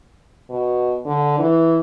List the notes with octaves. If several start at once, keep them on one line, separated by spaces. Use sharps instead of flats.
B2
D3
E3